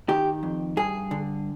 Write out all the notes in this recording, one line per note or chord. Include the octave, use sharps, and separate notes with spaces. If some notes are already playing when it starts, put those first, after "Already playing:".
D#3 G4
F2
G2 G#4
D3